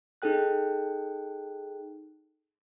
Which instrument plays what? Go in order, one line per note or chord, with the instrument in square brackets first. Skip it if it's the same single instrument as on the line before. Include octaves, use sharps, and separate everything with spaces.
[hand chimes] D#4 G#4 A4 G5 F#6